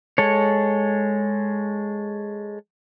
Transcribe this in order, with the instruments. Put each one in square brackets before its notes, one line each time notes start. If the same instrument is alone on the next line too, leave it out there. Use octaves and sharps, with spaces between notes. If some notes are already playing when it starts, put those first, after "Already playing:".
[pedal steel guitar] G#3 A4 C#5